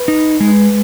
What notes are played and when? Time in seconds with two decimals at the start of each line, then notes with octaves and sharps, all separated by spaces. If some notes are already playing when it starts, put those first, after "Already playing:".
Already playing: B4
0.08 D#4
0.40 G#3